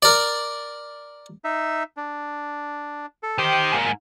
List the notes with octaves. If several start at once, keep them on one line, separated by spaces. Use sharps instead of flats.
A#4 D5
D#4 E5
D4
A4
D#3 G4 C5 D#6
G#2 A#3